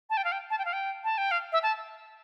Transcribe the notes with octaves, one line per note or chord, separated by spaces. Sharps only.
A5
G5
F5
G5
A5
G5
F5
G5
A5
G5
F5
E5
A5